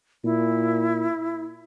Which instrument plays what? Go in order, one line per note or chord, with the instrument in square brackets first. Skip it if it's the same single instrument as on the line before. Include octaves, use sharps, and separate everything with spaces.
[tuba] A#2 [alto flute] E4